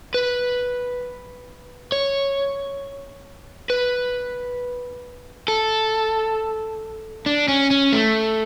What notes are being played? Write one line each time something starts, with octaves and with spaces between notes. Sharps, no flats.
B4
C#5
B4
A4
D4
C#4
C#4
A3